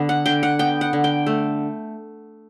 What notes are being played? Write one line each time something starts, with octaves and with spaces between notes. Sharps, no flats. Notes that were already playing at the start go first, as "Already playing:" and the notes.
Already playing: D3 B3
F#5
D3 G5
F#5
B3 G5
F#5
D3
G5
A3